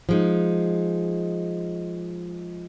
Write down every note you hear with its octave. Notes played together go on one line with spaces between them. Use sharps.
F3 G#3 D#4